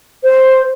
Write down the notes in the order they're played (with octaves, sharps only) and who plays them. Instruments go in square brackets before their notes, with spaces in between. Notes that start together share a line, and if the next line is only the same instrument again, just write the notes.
[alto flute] C5